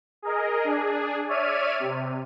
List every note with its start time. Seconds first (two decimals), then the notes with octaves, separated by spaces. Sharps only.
0.22 G#4 A#4 D#5
0.64 D4 G#4
1.28 C#5 D5 E5 F6 D#7
1.79 C3